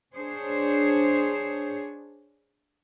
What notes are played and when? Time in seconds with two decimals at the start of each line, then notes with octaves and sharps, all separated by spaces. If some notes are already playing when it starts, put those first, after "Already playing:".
0.14 D4 G#4 C5 C#5